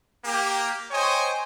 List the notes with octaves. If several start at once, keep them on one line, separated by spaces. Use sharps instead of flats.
A#3 G4
C5 C#5 D#5 G5 G#5